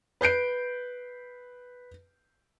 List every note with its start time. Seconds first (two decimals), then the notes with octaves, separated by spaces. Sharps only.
0.21 B4 G6 C7 D7